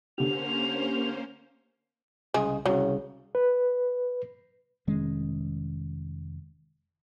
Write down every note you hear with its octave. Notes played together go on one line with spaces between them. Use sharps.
D3 A#3 C#4 G4 C5 F7
C2 C#3 G#3 G#4
C2 C#3 F#3
B4
F1 D#3 G#3 C#4